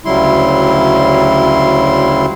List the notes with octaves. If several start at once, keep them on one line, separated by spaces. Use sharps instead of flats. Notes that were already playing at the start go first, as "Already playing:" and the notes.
D2 C#3 F#3 G3 E4 C6